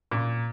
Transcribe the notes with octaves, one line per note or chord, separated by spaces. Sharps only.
A#2